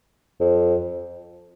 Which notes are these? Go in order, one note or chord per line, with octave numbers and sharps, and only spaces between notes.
F2